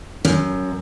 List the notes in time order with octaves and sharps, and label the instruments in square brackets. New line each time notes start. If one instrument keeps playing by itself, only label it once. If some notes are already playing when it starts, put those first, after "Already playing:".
[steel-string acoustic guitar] F#2